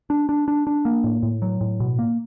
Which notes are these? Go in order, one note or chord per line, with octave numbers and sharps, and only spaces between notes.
D4
D4
D4
D4
A#3
A2
A2
F#3
A2
B2
A#3